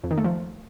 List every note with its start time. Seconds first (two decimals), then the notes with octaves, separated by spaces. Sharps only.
0.04 F2
0.11 D#3
0.18 A3
0.24 F3